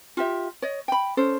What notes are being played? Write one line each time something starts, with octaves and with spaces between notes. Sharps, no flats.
F4 G4 E5
C#5 D#5
G5 B5
C#4 A4 C5